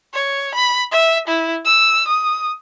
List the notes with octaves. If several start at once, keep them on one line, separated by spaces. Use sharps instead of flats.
C#5
B5
E5
E4
E6
D#6